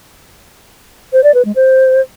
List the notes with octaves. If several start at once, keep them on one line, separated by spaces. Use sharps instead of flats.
C5
D5
B4
G#3
C5